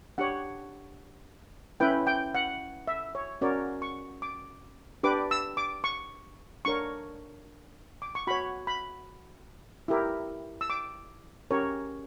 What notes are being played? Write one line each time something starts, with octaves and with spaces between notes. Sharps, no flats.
D4 G4 C#5 F#5
C#4 E4 B4 G5
G5
F#5
E5
C#5
C#4 F#4 A#4 C#5 D5
C#6
D6
D4 G4 B4 D6
E6
D6
C#6
D4 A#4 C#5 C#6
D6
C#6
F#4 C#5 B5
B5
E4 G4 A#4
E6
D6
C#4 G4 A#4 C#5